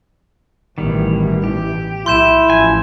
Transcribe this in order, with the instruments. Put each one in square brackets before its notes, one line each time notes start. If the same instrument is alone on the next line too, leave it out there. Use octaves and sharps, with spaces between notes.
[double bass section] A1 B2 E3 [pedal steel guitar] D#3 G3
[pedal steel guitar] G4
[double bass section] B1 [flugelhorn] E4 [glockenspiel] C6 G6 E7
[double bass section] A1 F3 [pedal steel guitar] G#5